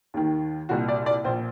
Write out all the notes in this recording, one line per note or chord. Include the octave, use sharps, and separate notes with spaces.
D#2 D#3
C2 A#2 F#4
D5
D5
A#1 A#2 C5